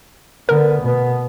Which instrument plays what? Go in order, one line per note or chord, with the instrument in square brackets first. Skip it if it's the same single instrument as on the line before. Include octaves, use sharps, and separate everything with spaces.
[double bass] D3 B3 [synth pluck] A#4
[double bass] B2 B3